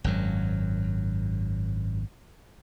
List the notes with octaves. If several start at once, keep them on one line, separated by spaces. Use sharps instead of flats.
G#1 F#2 F#3